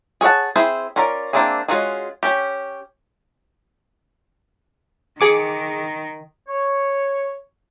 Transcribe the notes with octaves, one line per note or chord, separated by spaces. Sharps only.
G#4 C#5 D5 F#5 A5
C4 E4 G#4 C5
C#4 F4 A#4 D5
A#3 C4 D4 E4 G#4
G#3 C#4 F4 F#4 G#4
C#4 G4
D#3 G#4 D6 C#7
C#5